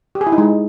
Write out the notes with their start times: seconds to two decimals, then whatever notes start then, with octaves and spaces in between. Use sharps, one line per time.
0.15 G4
0.21 G#4
0.27 E4
0.32 D#4
0.38 G#3